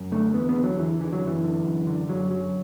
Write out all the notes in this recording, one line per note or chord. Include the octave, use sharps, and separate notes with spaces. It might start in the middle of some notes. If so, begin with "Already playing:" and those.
Already playing: F#2
D3 A3
E2 B3
B3
D3
F#3
E2 E3
D3 E3
F#3
F#2
E3
D3
F#2
D3
F#2 F#3
D3 F#3